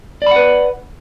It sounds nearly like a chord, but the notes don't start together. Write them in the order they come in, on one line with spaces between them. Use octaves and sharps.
D5 B5 F#5 B4